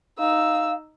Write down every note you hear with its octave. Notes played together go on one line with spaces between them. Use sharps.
D#4 F5 E6